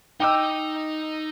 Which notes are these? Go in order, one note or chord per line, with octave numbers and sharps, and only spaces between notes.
D#4 D#5 G5 D6 E6